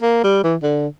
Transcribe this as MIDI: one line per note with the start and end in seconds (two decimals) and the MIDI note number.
0.02 0.23 58
0.24 0.43 55
0.43 0.56 52
0.63 0.87 50